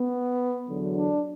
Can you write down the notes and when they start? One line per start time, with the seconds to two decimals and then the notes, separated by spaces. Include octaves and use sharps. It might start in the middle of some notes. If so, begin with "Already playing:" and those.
Already playing: B3
0.69 E2 D3 F#3
0.97 D4